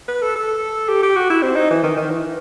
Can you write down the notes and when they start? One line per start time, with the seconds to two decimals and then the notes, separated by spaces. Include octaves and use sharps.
0.08 B4
0.22 A4
0.35 A4
0.89 G4
1.03 G4
1.16 F#4
1.30 E4
1.42 C4
1.56 D#4
1.70 E3
1.83 D#3
1.97 D#3
2.10 E3